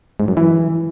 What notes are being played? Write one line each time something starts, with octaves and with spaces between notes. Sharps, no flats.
G#2
F#2
E3